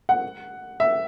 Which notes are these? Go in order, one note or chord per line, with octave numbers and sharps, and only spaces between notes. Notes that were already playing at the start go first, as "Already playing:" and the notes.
F#5
E5